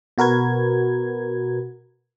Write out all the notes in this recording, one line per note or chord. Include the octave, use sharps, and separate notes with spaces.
B2 F#4 A#4 B4 G#6